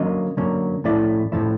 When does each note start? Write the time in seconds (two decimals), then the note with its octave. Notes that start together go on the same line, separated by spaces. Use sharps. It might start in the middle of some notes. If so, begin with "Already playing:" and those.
Already playing: D3 F#3 A#3 C#4 D#5
0.37 D3 F#3 A#3 C#4
0.84 A2 F3 A3 C#4 E4 D5
1.32 A2 F3 A3 C#4 E4